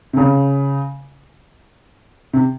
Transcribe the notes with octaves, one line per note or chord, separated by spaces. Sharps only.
C3
C#3
C3